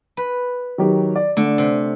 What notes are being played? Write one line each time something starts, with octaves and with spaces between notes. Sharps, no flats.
B4
D#3 F#3 G4
D5
D3 A3
C3